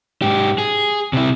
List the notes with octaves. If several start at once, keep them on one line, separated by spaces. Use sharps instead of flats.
G#2 G4
G#4
C3 E4